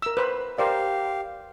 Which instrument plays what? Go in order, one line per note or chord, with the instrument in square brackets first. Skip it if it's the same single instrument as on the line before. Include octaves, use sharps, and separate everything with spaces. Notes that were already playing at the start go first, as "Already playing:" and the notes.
[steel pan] A#4 E6
B4 C5 B5
[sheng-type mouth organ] G4 F5 [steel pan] A#4 C5 D5